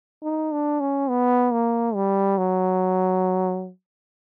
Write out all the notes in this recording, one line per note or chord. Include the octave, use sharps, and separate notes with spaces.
D#4
D4
C#4
B3
A#3
G3
F#3